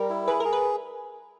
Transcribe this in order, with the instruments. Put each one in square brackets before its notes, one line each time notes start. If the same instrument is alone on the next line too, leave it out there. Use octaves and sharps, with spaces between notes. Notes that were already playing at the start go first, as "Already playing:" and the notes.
Already playing: [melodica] G3 [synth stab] A#4
[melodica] E4
[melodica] G#4 [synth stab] B4
[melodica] G#4 [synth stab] A#4
[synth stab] B4